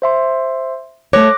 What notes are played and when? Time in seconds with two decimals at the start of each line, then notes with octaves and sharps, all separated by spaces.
0.02 C5 E5 C6
1.13 A3 C#5 D6 F#6 A#6